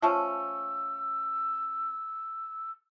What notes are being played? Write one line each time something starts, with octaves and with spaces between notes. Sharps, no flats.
F3 A3 C#4 E6